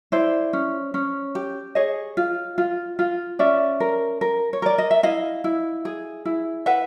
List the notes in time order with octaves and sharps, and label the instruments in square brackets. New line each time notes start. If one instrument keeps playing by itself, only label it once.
[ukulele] E4 C5 D5
C#4
C#4
G4
G#4 C#5 D#5
F4
F4
F4
C#4 D5 E5
A#4
A#4
C#5
A#4 D5
D#5
E5
E4 D#5 F5
E4
G#4
E4
B4 E5 F#5